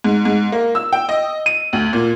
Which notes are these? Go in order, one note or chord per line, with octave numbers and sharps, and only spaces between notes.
G#2
G#2
A#3
E6
G5
D#5
D#7
D2
A#2